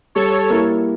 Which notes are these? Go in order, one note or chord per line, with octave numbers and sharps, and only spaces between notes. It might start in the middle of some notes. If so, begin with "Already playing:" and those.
G3 A4 C#5
A#3 E4 A#4